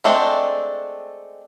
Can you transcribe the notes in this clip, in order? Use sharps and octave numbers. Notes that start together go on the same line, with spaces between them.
G#3 A3 C4 D4